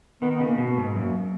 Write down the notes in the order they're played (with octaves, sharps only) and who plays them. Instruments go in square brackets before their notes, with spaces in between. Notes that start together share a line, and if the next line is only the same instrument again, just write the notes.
[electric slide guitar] D#3 [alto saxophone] B3
[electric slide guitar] C#3 [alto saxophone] B3
[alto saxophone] A#3
[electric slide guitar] B2
[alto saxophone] B3
[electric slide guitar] G#2
[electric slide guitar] F#2 [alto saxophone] A#3